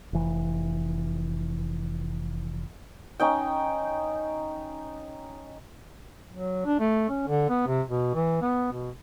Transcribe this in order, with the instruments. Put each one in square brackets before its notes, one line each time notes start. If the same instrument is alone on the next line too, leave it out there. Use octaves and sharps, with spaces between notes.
[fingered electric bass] F1 E3
[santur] C#4 D#4 G5
[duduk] F#3
D4
A3
C#4
D3
B3
C3
B2
E3
B3
B2